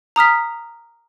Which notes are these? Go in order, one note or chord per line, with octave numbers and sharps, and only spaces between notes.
A#5 D#6 F6 B6